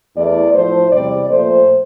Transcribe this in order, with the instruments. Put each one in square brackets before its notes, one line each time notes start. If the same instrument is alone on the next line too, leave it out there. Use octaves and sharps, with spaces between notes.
[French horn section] E2 E3 A3 D5
A2 F3 A3 C5
E2 C3 G3 D5
A#2 F3 A3 C5